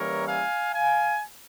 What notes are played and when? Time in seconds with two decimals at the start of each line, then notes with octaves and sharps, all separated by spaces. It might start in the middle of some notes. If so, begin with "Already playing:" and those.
Already playing: E3 G3 A#3 C#4 E4 A#4 C#5
0.26 F5 G#5
0.72 F5 G#5